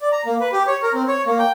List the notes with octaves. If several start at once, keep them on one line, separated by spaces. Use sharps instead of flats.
D5
A#5
A#3
B4
G4
C#5
A#4
C4
C#5
A#3
G5